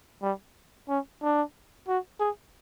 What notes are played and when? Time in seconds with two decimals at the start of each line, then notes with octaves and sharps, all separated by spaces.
0.22 G3
0.89 C#4
1.22 D4
1.88 F#4
2.20 G#4